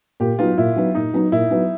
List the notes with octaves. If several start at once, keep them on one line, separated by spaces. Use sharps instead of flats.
A#2 G4
F#3 B3 D#4 F4
A#2 E4
F#3 B3 D#4
A#2 D#4
F#3 B3 D#4
A#2 E4
F#3 B3 D#4